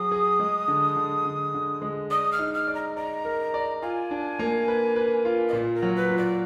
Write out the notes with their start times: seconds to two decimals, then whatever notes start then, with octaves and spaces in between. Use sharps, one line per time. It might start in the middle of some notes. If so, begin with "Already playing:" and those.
Already playing: F#3 G#4 D#6
0.12 G#4
0.40 G#3
0.68 D3
0.96 D3
1.25 D3
1.54 D3
1.82 G#3
2.11 D5 D#6
2.32 F6
2.39 D#4
2.54 F6
2.68 D5
2.75 A#5
2.96 D5 A#5
3.25 A#4
3.54 D5
3.82 F4 G#5
4.11 D4
4.39 A#3
4.68 B4
4.96 B4
5.25 F4
5.49 D#5
5.53 A#2 D5
5.75 A#4
5.82 F#3
5.96 B4
6.11 A#2
6.18 D5